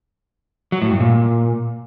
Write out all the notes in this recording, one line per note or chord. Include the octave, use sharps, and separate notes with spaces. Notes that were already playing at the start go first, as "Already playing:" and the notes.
F#3
A2
G2
A#2